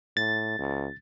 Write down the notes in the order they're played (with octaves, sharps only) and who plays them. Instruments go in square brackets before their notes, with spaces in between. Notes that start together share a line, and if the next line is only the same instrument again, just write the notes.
[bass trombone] A2 [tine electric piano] A6
[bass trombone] C#2